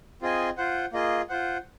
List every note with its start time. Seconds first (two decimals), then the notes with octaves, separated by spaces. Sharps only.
0.22 C4 F4 G#4 D#5 G#5
0.57 F4 C5 F#5
0.93 A#3 F4 G#4 D#5
1.29 F4 C5 F#5